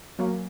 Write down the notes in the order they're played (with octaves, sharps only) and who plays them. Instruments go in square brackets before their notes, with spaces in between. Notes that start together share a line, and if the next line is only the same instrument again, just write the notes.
[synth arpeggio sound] F#3 A#3 C#4